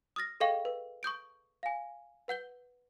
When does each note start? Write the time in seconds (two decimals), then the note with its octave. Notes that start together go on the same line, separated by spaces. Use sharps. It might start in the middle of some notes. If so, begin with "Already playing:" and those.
0.16 D#6 F6 A6 A#6
0.40 G#4 A4 D#5 F5 G5 C#6
0.65 B4
1.03 C#6 D#6 G6 D7
1.63 F5 G#5
2.28 B4 F#5 G6 G7